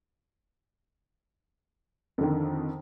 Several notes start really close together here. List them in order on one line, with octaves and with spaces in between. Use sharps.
F2 D3 D#3